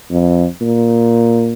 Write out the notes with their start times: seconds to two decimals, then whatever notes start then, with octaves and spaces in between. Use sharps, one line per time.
0.10 F2
0.60 A#2